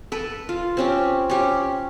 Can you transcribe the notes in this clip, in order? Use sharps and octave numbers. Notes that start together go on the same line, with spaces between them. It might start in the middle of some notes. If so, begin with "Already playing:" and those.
A4 B4
F4
C4 C#4 G4
C#4 G4